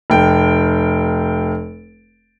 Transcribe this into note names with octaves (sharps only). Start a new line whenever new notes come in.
F1 G5